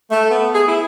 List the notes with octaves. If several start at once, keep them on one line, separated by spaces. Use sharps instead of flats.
A3
B3
G#4
E4